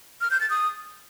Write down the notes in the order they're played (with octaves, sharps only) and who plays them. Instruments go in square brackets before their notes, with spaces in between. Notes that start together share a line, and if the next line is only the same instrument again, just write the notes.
[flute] F6
G6
A6
D#6